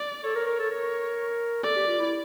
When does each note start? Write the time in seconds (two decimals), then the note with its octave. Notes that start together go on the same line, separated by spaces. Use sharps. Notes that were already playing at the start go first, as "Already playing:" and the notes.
Already playing: D5
0.24 A4 C#5
0.35 A#4
0.46 A#4
0.59 A4
0.71 A#4
1.63 A4 D5
1.76 G4
1.87 F4
1.99 E4